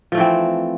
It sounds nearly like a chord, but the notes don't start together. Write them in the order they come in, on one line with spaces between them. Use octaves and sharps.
F3 A3 E3 C4